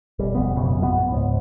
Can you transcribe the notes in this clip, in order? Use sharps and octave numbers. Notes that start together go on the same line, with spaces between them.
F1 B1 G3
E1 F2 B3
F1 B1 F#2 C#3
A#1 F#2 D#3 B3
C#2 G#2